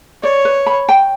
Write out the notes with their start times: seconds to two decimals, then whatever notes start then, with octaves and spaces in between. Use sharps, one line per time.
0.23 C#5 D5
0.45 B4
0.66 B5
0.89 G5